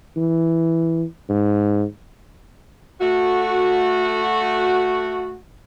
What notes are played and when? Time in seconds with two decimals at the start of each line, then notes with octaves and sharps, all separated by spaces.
0.16 E3
1.29 G#2
3.01 A3 F#4